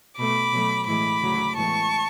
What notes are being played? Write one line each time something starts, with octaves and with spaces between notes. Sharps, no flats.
B2 A3 B5 D6
B2 F#3 A3
A2 E3 G#3 B5 D6
D2 C#3 F#3
A2 E3 G#3 B3 A5 C#6